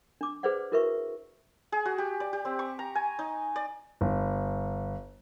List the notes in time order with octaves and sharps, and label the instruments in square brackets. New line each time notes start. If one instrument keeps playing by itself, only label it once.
[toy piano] D4 D6
G#4 B4 C5 D5 F#5
E4 F#4 A#4 B4 E5 C#6
[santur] G#4
F#4
G4
D5
G4
C4
C#6
A#5
G#5
D#4
D5
[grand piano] G1